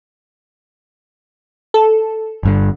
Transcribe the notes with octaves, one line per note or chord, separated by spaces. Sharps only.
A4
G1 G2 D3